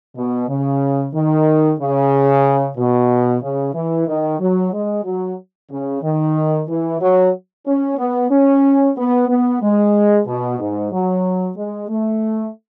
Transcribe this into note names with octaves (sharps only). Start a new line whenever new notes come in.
B2
C#3
D#3
C#3
B2
C#3
E3
D#3
F#3
G#3
F#3
C#3
D#3
E3
F#3
C#4
B3
C#4
B3
B3
G#3
B2
G#2
F#3
G#3
A3